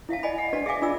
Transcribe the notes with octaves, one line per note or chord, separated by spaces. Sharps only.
E4 E5 F5 A5
D5 D#5 G#5 B5
F#5
D4 F#4 B4 D5 A5
G#4 E5 F5 G#5 D6
D4 F4 D5 E6